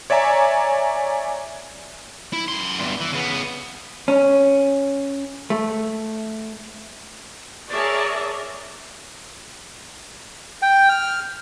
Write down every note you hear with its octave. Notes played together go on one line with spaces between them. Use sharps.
C#5 D5 E5 G#5 A#5
E4
F#2 C6
E2 G2
E3
C#3 B3
C#4
A3
G#4 A#4 C#5 D5 E5 A5
G5
F6